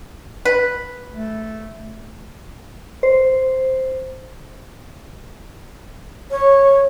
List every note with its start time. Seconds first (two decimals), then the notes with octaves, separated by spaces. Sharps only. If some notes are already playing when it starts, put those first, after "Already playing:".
0.45 B4
1.12 A3
3.03 C5
6.31 C#5